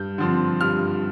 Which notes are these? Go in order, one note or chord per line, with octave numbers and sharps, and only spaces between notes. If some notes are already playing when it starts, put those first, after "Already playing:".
Already playing: G2 G6
D3 F3 C4
G2 F6